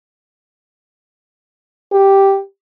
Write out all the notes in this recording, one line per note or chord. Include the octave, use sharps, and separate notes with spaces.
G4